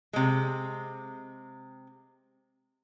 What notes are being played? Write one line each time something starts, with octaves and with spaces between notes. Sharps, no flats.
C3 G#3